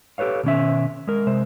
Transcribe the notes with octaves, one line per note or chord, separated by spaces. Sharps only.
G4 A4 B4 C#5 F5
B2 D#3 C#4 E5
G#3 A#4
C3 G#3 C5 E5